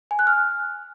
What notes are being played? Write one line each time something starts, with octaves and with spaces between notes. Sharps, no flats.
G#5
F#6
F6